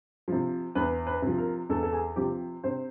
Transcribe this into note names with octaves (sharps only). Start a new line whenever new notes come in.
C3 F3
E2 B4
B4
C3 F3
A#4
E2 A4
A4
G#4
C3 F3 G4
C3 C5